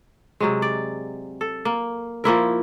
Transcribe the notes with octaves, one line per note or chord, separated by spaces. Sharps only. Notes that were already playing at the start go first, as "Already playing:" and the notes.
C3 F#3 G#3
D5
A4
A#3
F3 A#3 E4 A#4